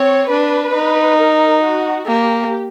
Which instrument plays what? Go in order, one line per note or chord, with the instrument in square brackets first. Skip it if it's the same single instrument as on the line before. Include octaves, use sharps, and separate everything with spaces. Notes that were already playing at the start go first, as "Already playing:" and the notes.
Already playing: [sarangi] C4 [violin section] C#5
[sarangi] D4 [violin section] B4
[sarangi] D#4
[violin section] A#4
F#4
[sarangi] A#3 [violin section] G4